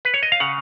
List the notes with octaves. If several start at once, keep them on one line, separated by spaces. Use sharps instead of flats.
B4
C#5
D#5
F5
C#3 F#5